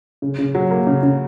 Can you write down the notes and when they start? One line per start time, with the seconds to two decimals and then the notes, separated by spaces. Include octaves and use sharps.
0.22 C#3
0.39 C#3
0.55 F#3
0.71 A#3
0.87 C#3
1.03 C#3